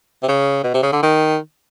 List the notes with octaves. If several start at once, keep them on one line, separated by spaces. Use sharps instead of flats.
C3
C#3
B2
C3
C#3
D3
D#3